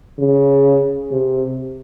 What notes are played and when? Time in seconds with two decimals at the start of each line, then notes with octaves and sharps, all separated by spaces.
0.19 C#3
1.12 C3